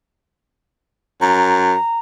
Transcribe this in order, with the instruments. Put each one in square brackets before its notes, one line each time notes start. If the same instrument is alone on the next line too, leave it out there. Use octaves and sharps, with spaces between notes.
[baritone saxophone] F#2 [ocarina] A#5